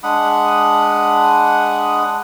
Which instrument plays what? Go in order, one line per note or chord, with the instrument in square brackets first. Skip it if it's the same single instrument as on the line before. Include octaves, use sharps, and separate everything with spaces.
[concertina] G#3 D4 F#5 B5 D#6